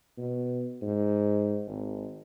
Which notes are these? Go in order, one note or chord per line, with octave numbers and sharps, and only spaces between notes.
B2
G#2
G#1